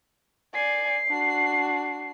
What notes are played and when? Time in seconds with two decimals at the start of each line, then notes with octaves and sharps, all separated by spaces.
0.54 D5 G#5 C7
1.08 D4 F#4